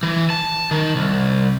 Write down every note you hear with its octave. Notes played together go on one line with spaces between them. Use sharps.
E3
A5
D#3
C2